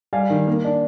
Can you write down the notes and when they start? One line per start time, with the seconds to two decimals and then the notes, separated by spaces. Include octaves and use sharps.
0.13 G3 F5 G#5
0.30 D#3
0.47 A#3
0.64 D4